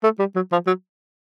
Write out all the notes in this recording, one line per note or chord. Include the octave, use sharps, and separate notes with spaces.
A3
G3
F#3
F3
F#3